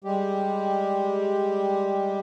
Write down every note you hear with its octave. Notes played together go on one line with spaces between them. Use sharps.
G3 G#3 G4